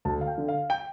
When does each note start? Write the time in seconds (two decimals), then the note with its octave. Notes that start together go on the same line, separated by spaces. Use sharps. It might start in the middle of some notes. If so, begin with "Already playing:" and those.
0.05 D2 A5
0.21 F5
0.27 G5
0.38 D3
0.48 F5
0.70 G5